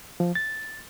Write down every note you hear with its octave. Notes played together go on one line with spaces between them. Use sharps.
F3
A6